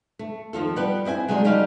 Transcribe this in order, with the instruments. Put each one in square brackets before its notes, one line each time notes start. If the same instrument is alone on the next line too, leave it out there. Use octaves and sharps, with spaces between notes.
[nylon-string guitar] A3
D#2 F3 F4 A4
G3 B3 G4 B4
C4 E4 D#5 G#5
F#3 G#3 A3 D4 F4 G4
C#3 F#3 G3 D#4 G4 F5